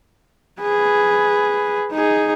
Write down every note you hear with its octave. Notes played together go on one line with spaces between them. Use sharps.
G#4 B4
D#4 G#4